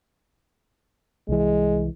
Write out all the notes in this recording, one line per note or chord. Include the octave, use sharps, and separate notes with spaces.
C2 E3 G#3